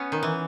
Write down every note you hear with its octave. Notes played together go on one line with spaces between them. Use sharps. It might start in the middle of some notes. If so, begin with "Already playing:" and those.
Already playing: B3 C#4
D#3
E3